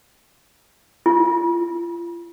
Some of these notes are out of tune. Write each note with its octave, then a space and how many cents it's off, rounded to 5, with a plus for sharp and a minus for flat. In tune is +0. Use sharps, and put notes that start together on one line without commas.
F4 -40